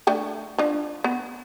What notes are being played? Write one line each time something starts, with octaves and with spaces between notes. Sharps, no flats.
A3 D4 G5
F3 D4
B3